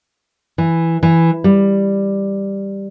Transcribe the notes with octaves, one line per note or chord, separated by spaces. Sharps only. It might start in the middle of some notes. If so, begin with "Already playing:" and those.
E3
E3
G3